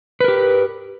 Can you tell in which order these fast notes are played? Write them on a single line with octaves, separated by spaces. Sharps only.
B4 A#4 G4